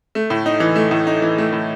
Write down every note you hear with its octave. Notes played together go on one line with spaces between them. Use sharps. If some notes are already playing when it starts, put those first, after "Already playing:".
A3
A2
D#4
E3
A3
A2
D#4
E3
A3
A2